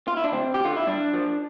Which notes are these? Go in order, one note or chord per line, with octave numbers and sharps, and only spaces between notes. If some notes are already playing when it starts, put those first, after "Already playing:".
F4
E4
D4
D2 C4
G4
F3
D3 F4
E4
G2 D4
F3